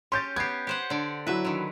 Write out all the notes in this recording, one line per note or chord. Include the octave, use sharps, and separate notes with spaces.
C#4 G4 C6 G6 A6
B3 G4 G#6 C7
G4 C5 F#5
D3 D5
F#3 E4 B4 E5
D3 D#3